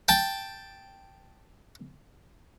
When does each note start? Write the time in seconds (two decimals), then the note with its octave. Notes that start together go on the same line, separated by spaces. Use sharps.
0.08 G5 A5